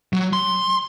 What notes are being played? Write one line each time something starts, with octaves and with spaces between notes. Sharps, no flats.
F#3
C6